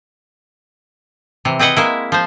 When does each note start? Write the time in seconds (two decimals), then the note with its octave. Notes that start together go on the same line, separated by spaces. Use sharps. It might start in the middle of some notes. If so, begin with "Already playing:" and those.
1.45 C3 E3
1.59 C4 G#4 B4 D#5 F#5
1.77 G#3 A#3 E4
2.12 F3 C5